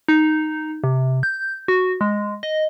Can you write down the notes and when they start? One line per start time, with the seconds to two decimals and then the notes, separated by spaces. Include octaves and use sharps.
0.08 D#4
0.84 C3
1.23 G6
1.68 F#4
2.01 G#3
2.43 D#5